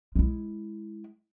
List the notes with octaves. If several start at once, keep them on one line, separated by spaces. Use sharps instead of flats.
G#3 E4